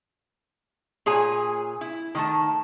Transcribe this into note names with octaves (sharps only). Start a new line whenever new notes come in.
A#2 G#4 C#5 G#5
E4
D#3 A3 A5